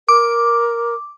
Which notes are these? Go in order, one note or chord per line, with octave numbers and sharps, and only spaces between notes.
A#4 D6